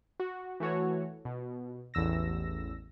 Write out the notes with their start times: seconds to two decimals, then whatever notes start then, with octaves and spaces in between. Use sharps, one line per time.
0.20 F#4
0.60 E3 A3 F#4 C#5
1.25 B2
1.94 A1 E2 E6 A#6